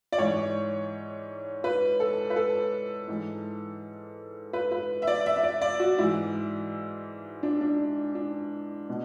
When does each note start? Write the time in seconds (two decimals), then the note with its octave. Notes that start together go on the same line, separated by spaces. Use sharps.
0.12 D5
0.18 G#2 E3 C#5
1.64 B4
2.00 A4
2.30 B4
2.36 A4
3.08 G#2 E3
4.53 B4
4.72 B4
5.02 E5
5.07 D5
5.26 E5
5.36 E5
5.43 D5
5.62 D5
5.80 F#4
5.98 G#2 E3 E4
7.43 D4
7.61 D4
8.15 D4
8.89 B2